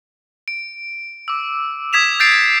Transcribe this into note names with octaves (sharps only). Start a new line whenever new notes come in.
D7
D6 E6
D#6 G#6 B6 E7 F7
G6 A6 C7 D7